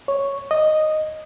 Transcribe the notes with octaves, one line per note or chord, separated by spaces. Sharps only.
C#5
D#5